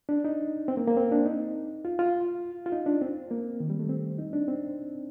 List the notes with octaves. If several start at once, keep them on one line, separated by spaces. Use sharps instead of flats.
D4
D#4
C4
A#3
A#3
C4
D4
D#4
F4
F4
F4
D#4
D4
C4
A#3
D#3
G3
A3
C4
D#4
D4
C4